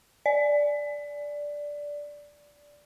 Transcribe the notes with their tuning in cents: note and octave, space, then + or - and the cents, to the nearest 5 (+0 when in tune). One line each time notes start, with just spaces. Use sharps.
D5 -5